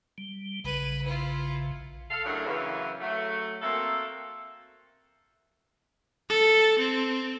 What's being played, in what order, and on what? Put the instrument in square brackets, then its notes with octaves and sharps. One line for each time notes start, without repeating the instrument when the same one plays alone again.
[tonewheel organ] G3
[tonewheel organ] A#1 C#3 [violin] B4 D#7
[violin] E4 F4
[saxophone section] A4 F5
F#2 A2 C#3 F#3 A3 D4
F#2 C#3 E3
F#3 A3
A#3 C4 F#4 A4 E5
[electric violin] A4
C4